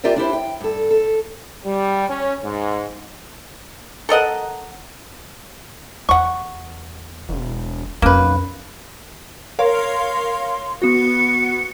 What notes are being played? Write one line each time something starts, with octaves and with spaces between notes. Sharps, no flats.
F4 G4 A#4 D5 E5
D4 E4 G4 C5
G5
G2 A4
A4
G3
C#4
G#2
A4 A#4 D#5 F#5
E2 F#5 C#6
E1
B1 F2 A#3 C#4 B4
A#4 C#5 F5 C6
B3 F#4 C#7